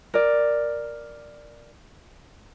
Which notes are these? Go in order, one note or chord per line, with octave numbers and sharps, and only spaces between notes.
A#4 D5